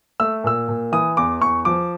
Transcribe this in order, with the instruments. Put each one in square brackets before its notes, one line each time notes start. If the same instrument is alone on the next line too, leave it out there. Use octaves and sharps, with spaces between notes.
[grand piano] A3 E6
A#2 E6
A#2
E3 D#6
E2 D6
E2 C#6
F3 D6